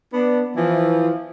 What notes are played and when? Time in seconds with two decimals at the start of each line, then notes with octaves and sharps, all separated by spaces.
0.13 B3 D4
0.56 E3 F3